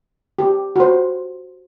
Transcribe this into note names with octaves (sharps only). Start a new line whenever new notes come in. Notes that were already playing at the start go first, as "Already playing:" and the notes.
G4
F#4 C5